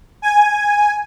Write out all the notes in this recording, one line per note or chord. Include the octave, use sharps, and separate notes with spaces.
G#5